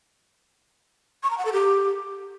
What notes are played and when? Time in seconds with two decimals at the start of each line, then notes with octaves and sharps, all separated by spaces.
1.23 C#6
1.31 A#5
1.38 F#5
1.45 A4
1.53 G4